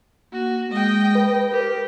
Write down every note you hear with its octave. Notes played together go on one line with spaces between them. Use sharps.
A#3 F#4
G#3 D#5 G5
B4
G4 A#4